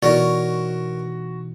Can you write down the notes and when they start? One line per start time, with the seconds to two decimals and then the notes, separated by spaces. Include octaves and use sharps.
0.02 B2 E3 D#4 F#4 A#4 C#5 D5